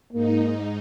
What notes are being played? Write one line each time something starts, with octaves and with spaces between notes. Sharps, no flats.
G#2 A#3 D#4